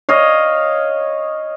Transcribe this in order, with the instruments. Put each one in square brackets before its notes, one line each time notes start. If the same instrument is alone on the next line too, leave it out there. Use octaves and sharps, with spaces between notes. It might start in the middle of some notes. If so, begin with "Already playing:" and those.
[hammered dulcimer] C#5 D#5 F5